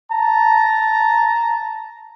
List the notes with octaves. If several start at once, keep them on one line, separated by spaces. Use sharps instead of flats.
A5 A#5